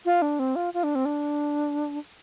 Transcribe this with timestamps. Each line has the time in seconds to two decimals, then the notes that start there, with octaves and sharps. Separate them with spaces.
0.05 F4
0.22 D4
0.39 C4
0.56 F4
0.74 F4
0.84 D4
0.95 C4
1.05 D4